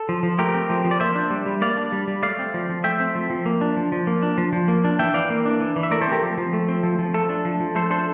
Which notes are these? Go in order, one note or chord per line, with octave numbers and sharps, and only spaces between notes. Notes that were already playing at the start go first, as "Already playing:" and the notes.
Already playing: A4
F3
F3
A3 G4 A#4
C4
F3
F3
D5
A#3 C5 E5
D4
G3
G3
A#3 D5 F5
D4
G3
G3
A3 D5 F5
C4
F3
F3
A3 E5 G5
C4
F3
F3
A#3
D4
F3
F3
A#3
D4
F3
F3
A#3
D4
E3 E5 G5
E3 D5 F5
A#3
D4
E3
E3
E5
A3 A#4 D5
A4 C5
C4
G4 A#4
F3
F3
A3
C4
F3
F3
A3 A4
D4
F3
F3
A3 A4 C5
D4 A4 C5